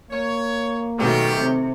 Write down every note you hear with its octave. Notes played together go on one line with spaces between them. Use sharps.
A#3 C#5
B2 D#3 F#3 A3 C#4 G4
C3